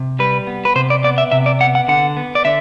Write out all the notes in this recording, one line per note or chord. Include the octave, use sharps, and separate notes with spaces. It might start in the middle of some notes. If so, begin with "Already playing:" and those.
Already playing: C3
G3 B4
B3
B4
C3 C5
D5
B3 D5
E5
C3 E5
D5
B3 F#5
F#5
D3 F#5
B3
D5
D3 E5